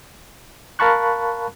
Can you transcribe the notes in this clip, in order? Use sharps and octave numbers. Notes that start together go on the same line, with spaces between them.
A#4 F5 A5 B5 C#6 F#6